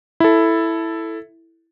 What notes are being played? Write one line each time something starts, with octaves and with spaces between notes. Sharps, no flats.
E4 A4